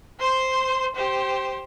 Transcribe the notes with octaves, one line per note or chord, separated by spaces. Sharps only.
C5 C6
G4 C5